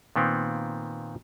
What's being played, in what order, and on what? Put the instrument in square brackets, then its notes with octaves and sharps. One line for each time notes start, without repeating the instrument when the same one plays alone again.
[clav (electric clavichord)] A#2 D#3 B3 C4